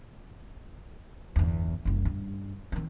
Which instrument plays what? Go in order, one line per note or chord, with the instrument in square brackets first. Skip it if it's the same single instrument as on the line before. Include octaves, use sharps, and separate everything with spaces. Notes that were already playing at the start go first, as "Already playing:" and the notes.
[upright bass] G1 E2
F#1 C2
G2
D#3 C4